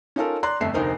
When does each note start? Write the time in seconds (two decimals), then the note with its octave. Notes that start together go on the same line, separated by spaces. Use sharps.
0.16 C#4 D#4 F4 A4 A#4
0.43 D5 A#5 C6 F#6
0.60 G1 F2 A3 E5 C7
0.74 F1 D2 D#4 A#4 C5